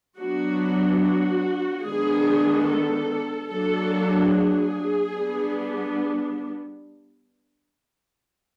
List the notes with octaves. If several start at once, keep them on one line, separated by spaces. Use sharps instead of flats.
F#3 B3 D4 F#4
F#4
D#3 G#3 B3 D4 G#4
A4
F#3 A#3 D4 A4
G#4
G3 B3 D4